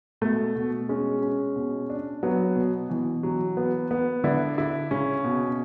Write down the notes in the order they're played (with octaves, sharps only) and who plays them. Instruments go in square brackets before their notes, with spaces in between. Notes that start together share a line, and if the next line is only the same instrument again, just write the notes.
[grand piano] B2 [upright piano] A3
[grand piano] B2
[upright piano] G#3 [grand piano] C#4
[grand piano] C#4
B2
D4
[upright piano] F#3 [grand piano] B3
[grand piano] B2
[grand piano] B2 [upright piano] E3
[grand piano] F#3
B3
B3
[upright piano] D3 [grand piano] E4
[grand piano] E4
[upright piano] C#3 [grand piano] C#4
[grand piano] B2